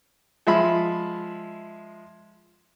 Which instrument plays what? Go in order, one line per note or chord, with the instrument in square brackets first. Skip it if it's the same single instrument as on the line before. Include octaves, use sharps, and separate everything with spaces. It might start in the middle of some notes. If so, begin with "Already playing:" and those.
[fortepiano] F3 G#3 E5 B5